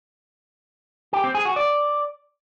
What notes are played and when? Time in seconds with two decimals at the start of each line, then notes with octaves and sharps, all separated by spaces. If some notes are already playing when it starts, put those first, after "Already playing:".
1.13 G4
1.24 C4
1.35 G#4
1.45 F#4
1.56 D5